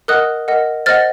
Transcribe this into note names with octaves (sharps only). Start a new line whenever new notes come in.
A#4 D#5 F#5 D#6 F#6
A#4 D#5 F#5
C5 D#5 F#5 F6 A6